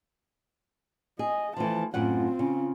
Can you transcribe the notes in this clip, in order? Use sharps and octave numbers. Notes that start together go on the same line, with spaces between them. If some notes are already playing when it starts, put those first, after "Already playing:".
G#4 D#5
E3 F3 A3 A5
F#2 A2 C4 F4 F#5
C#3